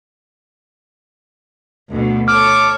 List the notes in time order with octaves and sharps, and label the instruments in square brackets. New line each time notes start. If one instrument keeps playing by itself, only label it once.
[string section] D2 B2
[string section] A4 C#5 [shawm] D6 [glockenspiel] F6